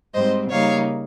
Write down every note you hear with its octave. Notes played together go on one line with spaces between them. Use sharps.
G#2 G3 C4 C5 D#5
C#3 G3 A#3 D#4 C#5 F5